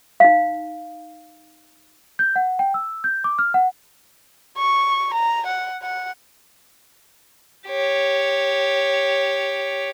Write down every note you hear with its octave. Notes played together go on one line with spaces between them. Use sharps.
D#4 F5
G6
F#5
G5
E6
G6
D6
F6
F#5
C#6
A#5
F#5
F#5
G4 C#5